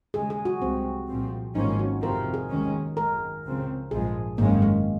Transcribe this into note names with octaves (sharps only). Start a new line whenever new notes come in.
D#2 C#3 G#3 G#4
G#4
F#4
C2 C3 F3 G#3 C4
C2 A#2 F3 C4
G#1 G#2 F3 A#3 C#4 D#4
F#4
F2 C3 F3 C4 A#4
G#4
D#2 D#3 G#3 C#4
G#1 F#2 D#3 G#3 A#4
C#2 C#3 F3 C4
A#1 G#2 F3 G#3 G#4
G#1 F#2 D#3 G#3 A#3 C#4
G#3